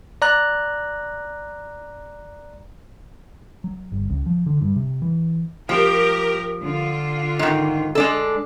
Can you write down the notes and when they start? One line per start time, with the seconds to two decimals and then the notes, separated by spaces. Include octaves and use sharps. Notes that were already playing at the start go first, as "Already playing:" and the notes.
0.22 D5 A#5 F#6
3.64 F#3
3.92 G1
4.10 C#2
4.26 F3
4.46 D3
4.62 G2
4.76 C3
5.02 E3
5.69 F3 G4 A#4
6.61 D3 F4
7.39 G#2 D#3
7.95 G#3 D4 A4